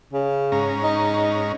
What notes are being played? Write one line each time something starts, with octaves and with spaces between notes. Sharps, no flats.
C#3
G#2 C#4 A#5
D#4